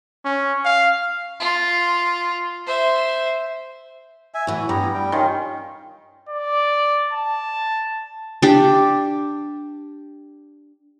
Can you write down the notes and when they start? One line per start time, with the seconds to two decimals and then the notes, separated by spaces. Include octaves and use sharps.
0.25 C#4
0.65 F5
1.40 F4
2.66 C5 E5
4.34 E5 G#5
4.47 A2 E3 F#4
4.69 G2 B3 G4 A#5
4.94 G3 G5
5.12 D#3 C#4 F4
6.29 D5
7.12 A5
8.42 D4 G4